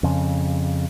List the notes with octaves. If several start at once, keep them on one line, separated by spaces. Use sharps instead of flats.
F2 C#3